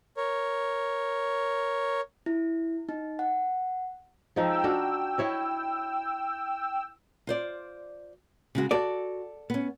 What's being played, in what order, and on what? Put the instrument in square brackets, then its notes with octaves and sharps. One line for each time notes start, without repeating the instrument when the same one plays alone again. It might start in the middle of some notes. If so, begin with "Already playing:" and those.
[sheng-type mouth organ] A#4 C#5
[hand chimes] E4
D#4
F#5
[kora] F3 G#3 D#4 [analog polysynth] G5 E6
[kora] D4 F#4 A#4
E4 C#5 D#5
[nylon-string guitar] F4 C5 D5
C#3 G#3 F#4
[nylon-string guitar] F#4 [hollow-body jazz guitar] A4 D5
[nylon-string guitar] B3 C#4